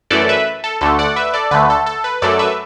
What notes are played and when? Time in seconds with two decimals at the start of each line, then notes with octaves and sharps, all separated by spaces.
0.10 F#2 E3 A3 A4 D5
0.29 B4 E5
0.64 A4
0.81 D2 D3 A3 A4
0.99 D5 F#5
1.16 B4 E5
1.34 A4 D5
1.51 D2 D3 A3 B4
1.70 A4
1.86 A4
2.04 B4
2.22 F#2 F#3 A3 A4 D5
2.39 B4 E5